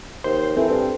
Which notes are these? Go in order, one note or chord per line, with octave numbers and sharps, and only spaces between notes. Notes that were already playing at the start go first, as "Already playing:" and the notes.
D#2 C5
E3 C4 A4
G2